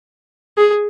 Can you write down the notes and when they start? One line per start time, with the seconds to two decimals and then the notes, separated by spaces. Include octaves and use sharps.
0.57 G#4